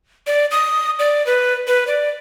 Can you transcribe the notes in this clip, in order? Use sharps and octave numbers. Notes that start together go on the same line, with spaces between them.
D5
D#6
D5
B4
B4
D5